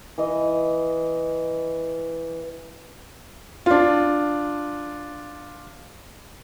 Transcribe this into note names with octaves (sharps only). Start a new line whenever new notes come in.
E3 D#5
D4 F4